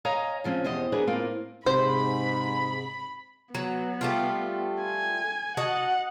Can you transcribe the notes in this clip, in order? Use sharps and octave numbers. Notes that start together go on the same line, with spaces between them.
C#5 D#5 F5 G#5 A#5
C#3 F3 C4 C#4
E2 B2 G4 C5 D#5
F#3 B3 D4 G#4 A#4 B4
A2 A#3 C4 F4
G#2 C3 C5 B5
F#3 B3
G3 A3 F4
G#5
F#4 D#5 F#5 A5